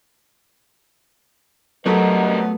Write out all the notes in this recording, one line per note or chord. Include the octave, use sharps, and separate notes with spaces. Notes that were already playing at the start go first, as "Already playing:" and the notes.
F#3 G3 A3 B3 D#4 A#4 B4 D#5